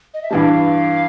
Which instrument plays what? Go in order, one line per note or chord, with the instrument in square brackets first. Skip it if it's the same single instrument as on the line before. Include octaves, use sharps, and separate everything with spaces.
[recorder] D#5
E5
[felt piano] G2 E3 G3 [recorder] F5 A5